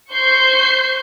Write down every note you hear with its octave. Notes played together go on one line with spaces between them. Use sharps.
C5 C#6 G6 C7